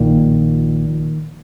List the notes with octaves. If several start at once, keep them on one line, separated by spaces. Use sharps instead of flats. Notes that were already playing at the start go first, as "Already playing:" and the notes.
Already playing: A#1 A#2 D#3